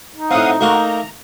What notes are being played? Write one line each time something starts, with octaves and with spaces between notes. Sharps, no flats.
D#4
A2 C4 F5 F#5 D#6
A3 A#3 F#4 A#4
A#5